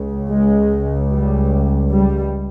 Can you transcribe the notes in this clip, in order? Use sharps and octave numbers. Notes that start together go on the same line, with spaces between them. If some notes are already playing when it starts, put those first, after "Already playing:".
Already playing: C#2 C#3
G#3
G3
G3